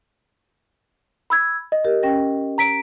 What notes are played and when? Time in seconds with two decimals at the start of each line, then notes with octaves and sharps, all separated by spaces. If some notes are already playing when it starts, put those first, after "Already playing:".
1.30 B5 E6 G#6
1.72 D#5
1.84 G4 A#4
2.03 C#4 G5 A#6
2.58 A#5 B6 D7